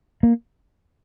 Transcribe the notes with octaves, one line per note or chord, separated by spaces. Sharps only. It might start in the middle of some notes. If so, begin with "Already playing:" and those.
A#3